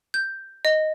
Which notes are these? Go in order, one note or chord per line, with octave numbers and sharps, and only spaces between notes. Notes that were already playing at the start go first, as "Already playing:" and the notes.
G6
D#5